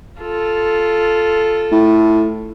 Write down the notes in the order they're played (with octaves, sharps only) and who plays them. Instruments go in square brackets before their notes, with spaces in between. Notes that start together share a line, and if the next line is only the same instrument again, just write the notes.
[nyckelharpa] F4 A4
[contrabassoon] A2